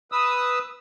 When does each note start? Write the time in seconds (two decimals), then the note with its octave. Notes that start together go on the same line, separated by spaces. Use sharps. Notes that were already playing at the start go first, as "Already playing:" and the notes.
0.12 B4 D#6 E6